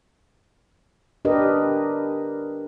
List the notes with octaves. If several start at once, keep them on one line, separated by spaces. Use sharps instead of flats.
D4 G4 A#4 B4 D#5